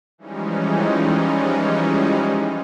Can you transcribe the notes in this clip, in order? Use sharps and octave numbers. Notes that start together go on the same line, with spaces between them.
E3 F3 G3 G#3 C#4 D#4